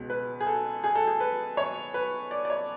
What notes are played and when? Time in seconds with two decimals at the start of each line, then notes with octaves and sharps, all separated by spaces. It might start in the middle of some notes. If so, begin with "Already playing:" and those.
Already playing: C#2 B2
0.10 B4
0.41 G#4
0.47 A4
0.84 G#4
0.95 A4
1.07 G#4
1.20 B4
1.57 C#5
1.94 B4
2.31 D5
2.45 D5
2.50 C#5